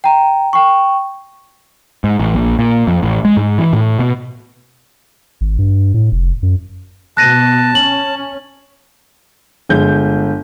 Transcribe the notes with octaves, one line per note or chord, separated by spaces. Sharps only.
G5 A#5
G5 C#6
G#2
A1
A#1
A#2
F2
A1
G#3
G#2
E3
A2
B2
G#1
G2
A2
F1
F#2
B2 A5 F#6 A#6 D#7
C#4 F#7
G1 G#3 G6